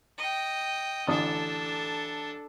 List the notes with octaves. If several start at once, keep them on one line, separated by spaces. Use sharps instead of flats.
D#5 G5
A1 D3 D4 A4 D#6